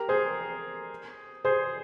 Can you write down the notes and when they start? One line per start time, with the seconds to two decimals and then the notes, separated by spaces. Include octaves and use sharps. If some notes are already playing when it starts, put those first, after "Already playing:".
Already playing: G4 A#4
0.09 G#4 C5
1.45 G#4 C5